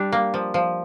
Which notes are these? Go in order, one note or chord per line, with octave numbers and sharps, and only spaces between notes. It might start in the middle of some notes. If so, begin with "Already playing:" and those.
Already playing: G3 D4
A#3
F3
F3